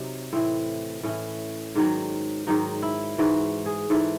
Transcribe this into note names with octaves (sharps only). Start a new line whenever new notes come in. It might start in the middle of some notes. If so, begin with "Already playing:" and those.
Already playing: C3 F#3 D#4
A2 E3 C4
A2 E3 C#4
G#2 D#3 F#3
G#2 D#3 F#3 D#4
E4
G#2 E3 F#4
G#4
G#2 E3 A4